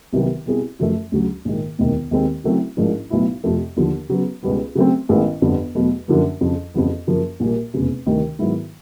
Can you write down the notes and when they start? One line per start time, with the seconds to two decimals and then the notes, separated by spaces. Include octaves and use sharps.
0.13 C2 C3 D#3 F#3 B3
0.46 B2 G3 C4 E4 G#4
0.79 F#2 C#3 F3 A3
1.12 D2 C#3 F#3
1.45 A#1 G#2 D#3
1.79 E1 D2 C3 D#3
2.11 D#2 D#3 G#3 C4
2.44 C#3 F#3 A3 C4 E4
2.77 A1 G#2 F3 A#3 D4
3.10 B1 A2 F#3 B3 E4
3.44 F2 C3 F3 A3
3.77 D#2 D3 F3
4.10 C#3 F#3 B3
4.43 C#2 B2 G3 B3
4.75 C#3 F#3 A3 C4
5.09 A1 G2 D#3 G#3 B3
5.42 G1 F2 D3 G3 B3
5.75 E2 B2 F#3 A3
6.08 F#2 D3 F3 A#3
6.41 F2 C#3 F3
6.74 F2 C#3 E3 G3 B3
7.07 F#2 C#3 F3 A#3
7.40 A#1 A#2 G3 A#3
7.74 F1 E2 C#3
8.07 D2 C3 D#3 G3
8.39 G#2 D#3 F#3 B3 E4